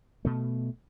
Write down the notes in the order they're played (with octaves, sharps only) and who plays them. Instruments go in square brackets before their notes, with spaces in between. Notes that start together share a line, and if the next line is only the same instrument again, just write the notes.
[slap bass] B2 A3